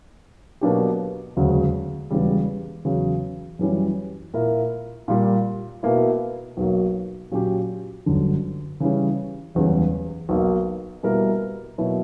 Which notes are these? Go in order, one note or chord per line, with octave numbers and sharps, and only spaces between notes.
B2 F#3 A#3 D4 G4
E1 D2 C#3 F#3
E1 E2 C#3 G3
E2 C#3 F#3
F#2 E3 G3 C#4
A#2 A#3 E4 A#4
A#2 G3 A#3
B2 A#3 E4
B1 B2 F#3 A#3
A#2 F#3 C#4 G4
G1 F#2 D3
C#3 E3 G3 C#4
F#1 E2 C#3 G3 C#4
B1 B2 A#3
B2 G3 A#3 E4 A#4
B2 F#3 A#3 E4